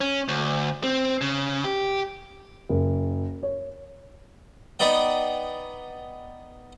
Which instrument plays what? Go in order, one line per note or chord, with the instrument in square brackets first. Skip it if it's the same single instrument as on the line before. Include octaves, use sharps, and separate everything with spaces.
[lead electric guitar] C#4
D2
C4
C#3
G4
[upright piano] F#1
C#5
[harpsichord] B3 D#4 D5 G5